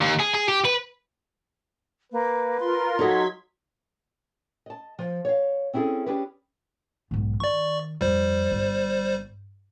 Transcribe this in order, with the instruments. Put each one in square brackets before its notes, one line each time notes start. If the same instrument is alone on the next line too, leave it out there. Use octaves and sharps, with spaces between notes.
[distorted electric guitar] D#2
G#4
G#4
G4
B4
[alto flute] A#3 [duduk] B4
[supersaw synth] F4 A#4 [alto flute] C6
[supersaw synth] F#3 G#6 B6 [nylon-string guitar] D#4 A4 D#5 [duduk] F#4
[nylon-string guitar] D#5 A5
F3
C#5 F5
C4 C#4 E4 F#4 G#4 A4
C#4 D4 G4 G#4 B4
[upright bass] B1 G#2
[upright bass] D#3 [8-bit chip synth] D5 C#6
[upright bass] F2 [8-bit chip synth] G3 C5
[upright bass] G1